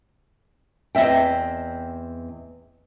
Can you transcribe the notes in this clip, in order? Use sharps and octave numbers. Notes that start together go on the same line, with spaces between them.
E2 C4 D#5 E5 G5